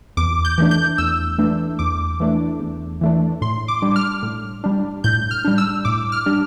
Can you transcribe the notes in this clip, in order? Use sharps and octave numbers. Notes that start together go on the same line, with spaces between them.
E2 D6
G6
E3 A3 D4
G6
E2 E6
E3 A3 D4
E2 D6
E3 A3 D4
E2
E3 A3 D4
A2 C6
D6
G3 D4
F6
A2
G3 D4
A2 G6
F6
G3 D4
E6
A2 D6
F6
G3 D4